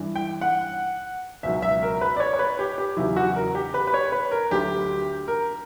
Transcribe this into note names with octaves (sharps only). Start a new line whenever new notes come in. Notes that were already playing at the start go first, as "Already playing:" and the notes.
Already playing: G2 E3
G5
F#5
C#2 B2 F#3 E5
E5
A#4
B4
D5
C#5
C#5
B4
G4
G4
E2 C#3 F#3 E4
F#4
A#4
G4
B4
B4
C#5
B4
A#4
D2 D3 F#3 G4
A#4